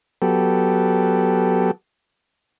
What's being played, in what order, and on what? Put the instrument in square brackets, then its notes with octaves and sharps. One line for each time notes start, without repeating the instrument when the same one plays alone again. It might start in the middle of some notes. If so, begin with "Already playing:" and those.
[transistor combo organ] F#3 B3 G4 A4